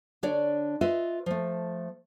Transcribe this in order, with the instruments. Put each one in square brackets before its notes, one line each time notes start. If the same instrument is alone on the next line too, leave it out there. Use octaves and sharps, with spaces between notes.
[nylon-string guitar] D3 D4 C#5 D5
F4 B4 D#5 E5
F3 A3